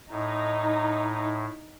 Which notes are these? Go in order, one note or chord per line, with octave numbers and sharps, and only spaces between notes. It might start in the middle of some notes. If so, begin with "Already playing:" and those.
A2 D#4